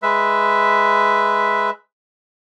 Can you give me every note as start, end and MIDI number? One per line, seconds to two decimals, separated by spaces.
0.03 1.70 56
0.03 1.70 71
0.03 1.70 76